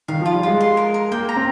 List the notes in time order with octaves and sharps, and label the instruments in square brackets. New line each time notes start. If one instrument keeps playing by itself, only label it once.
[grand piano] D#3 [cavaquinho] F5
[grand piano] F3 [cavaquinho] F4
[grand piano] G3
[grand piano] G#3 [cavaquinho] F4
[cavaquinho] C6
A#4
A#4
[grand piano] A#3 [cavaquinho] G5
[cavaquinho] A#5
[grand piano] C4